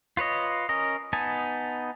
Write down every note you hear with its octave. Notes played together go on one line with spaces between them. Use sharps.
F4 B4 C#5 D#5
C#4 A#4 D#5
B3 D#4 G#5 A5